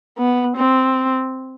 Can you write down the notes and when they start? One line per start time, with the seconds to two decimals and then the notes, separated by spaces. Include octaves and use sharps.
0.18 B3
0.57 C4